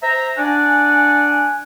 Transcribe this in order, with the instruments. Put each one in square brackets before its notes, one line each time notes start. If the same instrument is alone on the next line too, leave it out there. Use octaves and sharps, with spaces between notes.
[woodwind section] C5 E5 A#5
D4 D5 F#5 G#5